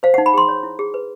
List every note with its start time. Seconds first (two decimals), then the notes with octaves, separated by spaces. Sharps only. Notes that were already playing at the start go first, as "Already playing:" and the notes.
0.03 C5 F5
0.14 F#5
0.18 D#4
0.26 B5
0.34 G#4 C6
0.48 C#5
0.63 E4
0.79 G#4
0.94 B4